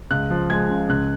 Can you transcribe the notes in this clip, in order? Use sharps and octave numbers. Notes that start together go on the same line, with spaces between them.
C#2 F#6
F3
G#3 G#6
C#3
C#2 F#6